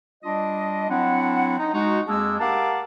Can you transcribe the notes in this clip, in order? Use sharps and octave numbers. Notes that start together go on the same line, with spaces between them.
G3 D4 F4 D#5
F#3 C4 D4 E4 F#5
D#4
G#3 D#4 F#4
F2 G#3 A#3 D4 G#4 E6
G4 A#4 F5 F#5 A5 D6